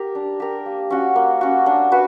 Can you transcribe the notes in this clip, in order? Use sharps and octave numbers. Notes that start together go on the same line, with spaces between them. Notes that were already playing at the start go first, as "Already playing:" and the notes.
Already playing: G4 A#4
D4
G4 A#4
A#3
C#4 F#4
A#3
C#4 F#4
D4
F#4 B4